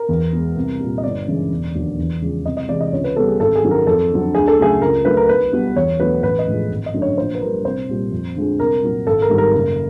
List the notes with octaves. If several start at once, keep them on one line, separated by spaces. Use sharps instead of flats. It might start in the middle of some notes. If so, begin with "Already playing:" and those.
Already playing: A#4
E2
B2 G#3
C2
A#2 G3
D#5
G1 D5
F#2 C#3 E3 G#3
E1
D#2 D3 F#3
E2
C#3 F3 G#3
C2 D#5
D#5
C3 E3 G#3 D5
D#5
C#2 C#5
B4
B2 G3 A4
G#4
G#1 A4
G#4
F#2 D#3 F#3
A#4
F2 A4
D3 F#3
D2 G#4
A4
C#3 F#3 A3 G#4
C#2 A#4
C#3 F#3 A3 B4
A#4
B1 B4
B2 G3
E2 C#5
B2 F#3 A3 B4
A1 B4
D#5
A2 F3 G#3
G#1
D#5
F#2 D3 F#3 A3
C#5
A#1 C5
B4
A#2 G3 A#4
C2 C5
A#2 G3
F2
D3 F3 G#3
C2 A#4
A#2 F#3
G#1 A4
A#4
G#2 D#3 G3
A#4
F#1 A#4